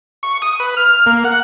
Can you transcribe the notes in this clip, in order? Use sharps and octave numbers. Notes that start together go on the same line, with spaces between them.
C#6
D#6
B4
F6
A#3
F#5